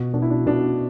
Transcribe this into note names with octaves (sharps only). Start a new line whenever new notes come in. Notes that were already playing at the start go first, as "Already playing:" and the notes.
Already playing: B2 F#4
B2 D4
E4
D4
B2 D4